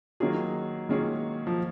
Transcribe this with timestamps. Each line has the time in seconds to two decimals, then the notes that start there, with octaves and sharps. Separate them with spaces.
0.20 D#3 F#3 A#3 C#4 F4 G#4
0.89 D#3 G#3 A#3 C#4 F4 G#4
1.47 F3